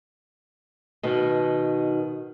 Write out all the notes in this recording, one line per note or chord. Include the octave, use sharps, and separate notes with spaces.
B2 D#3